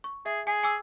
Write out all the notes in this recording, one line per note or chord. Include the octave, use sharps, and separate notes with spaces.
C#6
G#4 E5
G#4 G#5
G#5 D6 E6